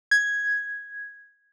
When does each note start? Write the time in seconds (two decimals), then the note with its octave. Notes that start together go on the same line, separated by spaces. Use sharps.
0.11 G#6